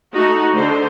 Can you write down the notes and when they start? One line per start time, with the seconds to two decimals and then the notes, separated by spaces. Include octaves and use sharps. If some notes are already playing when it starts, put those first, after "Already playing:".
0.13 A3 D#4 F#4
0.55 D3 C5